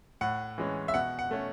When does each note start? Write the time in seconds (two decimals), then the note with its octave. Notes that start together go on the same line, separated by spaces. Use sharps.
0.21 A2 F#5
0.58 E3 G#3 C#4
0.88 E5
0.94 B2 F#5
1.19 F#5
1.31 A3 C#4